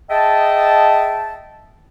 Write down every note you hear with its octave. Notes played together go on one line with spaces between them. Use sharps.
G#4 D#5 E5 G5 A5